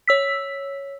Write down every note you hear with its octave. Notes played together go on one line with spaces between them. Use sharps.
C#5 E6 B6